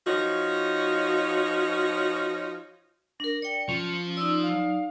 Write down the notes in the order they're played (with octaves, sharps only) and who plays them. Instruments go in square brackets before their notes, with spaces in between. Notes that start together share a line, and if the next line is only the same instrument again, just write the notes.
[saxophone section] F3 D#4 F#4 C#5
[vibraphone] D4 A#4 [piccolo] A#6
[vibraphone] D5 G5 [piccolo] C#7
[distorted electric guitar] F3 [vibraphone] C#4
[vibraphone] D#4 D5 [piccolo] E6
[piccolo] F5